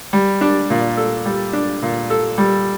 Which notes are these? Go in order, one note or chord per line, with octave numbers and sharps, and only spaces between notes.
G3
D4
A#2
A4
G3
D4
A#2
A4
G3